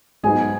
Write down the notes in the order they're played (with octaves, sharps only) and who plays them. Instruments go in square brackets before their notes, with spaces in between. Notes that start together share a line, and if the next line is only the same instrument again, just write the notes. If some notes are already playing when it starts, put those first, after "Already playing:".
[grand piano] G#2 F#3 B3 D#4 G#4 G#5